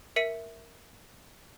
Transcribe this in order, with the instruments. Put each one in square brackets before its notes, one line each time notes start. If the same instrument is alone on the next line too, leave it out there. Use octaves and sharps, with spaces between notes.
[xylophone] A#4 E5 B6 C#7 D#7